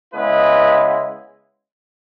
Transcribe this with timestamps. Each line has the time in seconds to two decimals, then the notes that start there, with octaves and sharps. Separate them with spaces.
0.14 C#3 G#3 B3 E4 B4 D#5